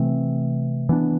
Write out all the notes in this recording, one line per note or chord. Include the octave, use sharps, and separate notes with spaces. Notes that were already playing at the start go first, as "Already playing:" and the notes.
Already playing: C3 E3 A3 C4
E3 B3 D4